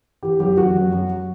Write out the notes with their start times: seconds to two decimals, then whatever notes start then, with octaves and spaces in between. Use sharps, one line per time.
0.23 E3 G4
0.40 F#2 G4
0.57 F#2 F#4
0.74 F#2
0.92 F#2